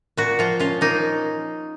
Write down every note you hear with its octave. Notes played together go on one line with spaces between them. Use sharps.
A#2 F#4
F3 F4
C#4 F4
A#3 D#4